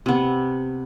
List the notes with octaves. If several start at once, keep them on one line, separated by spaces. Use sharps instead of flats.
C3 B3